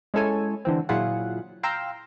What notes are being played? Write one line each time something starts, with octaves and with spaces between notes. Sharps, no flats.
G#3 C#4 E4 A4 C#5 G#5
D3 E3 C4
A#2 F#3 E4 F4 G#4 F#5
F5 G5 A#5 C6 E6